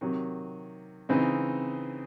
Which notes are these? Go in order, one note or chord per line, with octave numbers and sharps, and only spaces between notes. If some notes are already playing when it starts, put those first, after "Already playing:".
C3 D#3 F#3
C#3 E3 C4 D#4